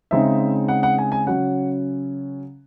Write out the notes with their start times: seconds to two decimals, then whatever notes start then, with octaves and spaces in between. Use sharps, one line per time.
0.11 C#3 G#3 C4 D#4 E5
0.68 F#5
0.83 F#5
0.98 G#5
1.12 G#5
1.27 C#3 F#3 C#4 F#5